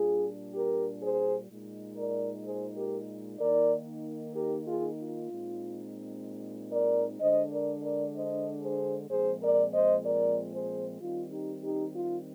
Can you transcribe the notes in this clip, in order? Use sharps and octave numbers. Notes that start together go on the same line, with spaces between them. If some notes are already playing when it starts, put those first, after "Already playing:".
Already playing: A#2 G3 D4 F4 G#4
G4 A#4
G#4 C5
A#2 G#3 D#4
A#4 D5
G#4 C5
G4 A#4
D#3 A#3 D#4 A#4 D5
G4 A#4
F4 G#4
F4
A#2 G#3 C4 D#4
A#4 D5
D3 G#3 D4 C5 D#5
A#4 D5
A#4 D5
C5 D#5
G#4 C5
A#2 F3 G#3 C4 G#4 C5
A#4 D5
C5 D#5
A#4 D5
G#4 C5
D#3 G3 C4 D#4 F4
D#4 G4
D#4 G4
F4